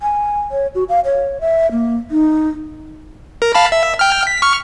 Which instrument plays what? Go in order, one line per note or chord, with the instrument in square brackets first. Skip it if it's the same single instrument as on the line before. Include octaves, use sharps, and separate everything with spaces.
[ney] G#5
C#5
F#4
F5
C#5
E5
A#3
D#4
[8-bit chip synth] A#4
F5 A5 B5
E5
G5 F6
B6
C#6 F6